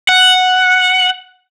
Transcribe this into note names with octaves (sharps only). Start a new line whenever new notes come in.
F#5